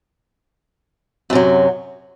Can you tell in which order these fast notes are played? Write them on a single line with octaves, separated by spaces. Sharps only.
F#2 C3 F#3